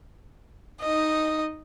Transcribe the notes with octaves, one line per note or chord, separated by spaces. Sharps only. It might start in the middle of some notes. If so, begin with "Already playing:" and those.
D#4 D#5